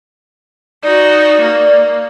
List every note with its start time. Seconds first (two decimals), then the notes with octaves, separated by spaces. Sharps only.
0.83 D#4 F#4 D5
1.40 A#3